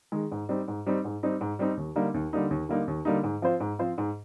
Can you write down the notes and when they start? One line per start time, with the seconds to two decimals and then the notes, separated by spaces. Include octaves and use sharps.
0.12 D#3 G#3
0.31 G#2
0.49 G3 C4 D#4
0.68 G#2
0.86 G3 C4 D#4
1.05 G#2
1.23 G3 C4 D#4
1.41 G#2
1.59 G3 C4 D#4
1.77 D#2
1.96 D3 G3 A#3 D#4
2.14 D#2
2.33 D3 G3 A#3 D#4
2.51 D#2
2.69 D3 G3 A#3 D#4
2.88 D#2
3.05 D3 G3 A#3 D#4
3.23 G#2
3.42 F3 C4 F4 C5
3.60 G#2
3.79 F3 C4 F4 C5
3.98 G#2